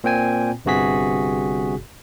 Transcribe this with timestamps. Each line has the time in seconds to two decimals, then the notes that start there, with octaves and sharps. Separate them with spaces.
0.04 A#2 C4 G5 G#5
0.65 G1 G2 C3 F#4 G#4 B6